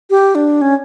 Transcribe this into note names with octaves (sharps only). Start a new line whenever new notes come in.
G4
D4
C#4